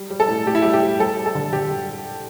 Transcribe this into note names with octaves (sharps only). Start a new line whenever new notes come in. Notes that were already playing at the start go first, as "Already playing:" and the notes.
Already playing: G3
G3
A4
A2
A2 G4
E4
G3 G4
G4
G3
G3 A4
G3
A4
D3
D3 G4
G3